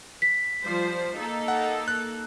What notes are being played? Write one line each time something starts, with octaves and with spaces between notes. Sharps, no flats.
B6
F3 G3 C5
A#3 D#4 A4
F#5
F#6